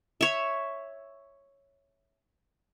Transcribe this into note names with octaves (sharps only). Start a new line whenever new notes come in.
C#5 E5